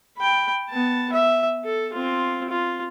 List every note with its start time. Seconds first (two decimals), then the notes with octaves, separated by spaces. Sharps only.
0.17 G5 B5
0.69 B3 A5
1.13 E5
1.64 A4
1.93 C4 F4
2.50 F4